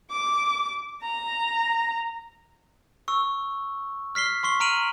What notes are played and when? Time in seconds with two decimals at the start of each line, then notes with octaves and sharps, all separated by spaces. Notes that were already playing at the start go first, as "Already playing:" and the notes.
0.10 D6
1.03 A#5
3.08 C#6 E6
4.15 F6 B6 C7 G7
4.43 C6 C#6 C7 G7
4.60 A#5 F6 D7 D#7 F7 F#7